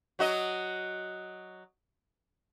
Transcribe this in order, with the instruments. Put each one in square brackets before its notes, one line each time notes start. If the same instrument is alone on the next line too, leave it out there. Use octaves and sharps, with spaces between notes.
[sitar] F#3 F#4 D#5